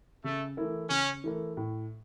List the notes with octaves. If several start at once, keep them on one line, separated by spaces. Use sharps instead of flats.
C#3 A3
E3 A3 E4 A#4
C#3 C#4
E3 A3 E4 A#4
A2